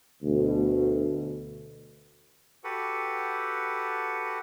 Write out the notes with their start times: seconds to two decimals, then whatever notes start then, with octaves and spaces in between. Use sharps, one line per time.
0.23 D2 B2
2.64 F#4 G4 A4 B4 F#5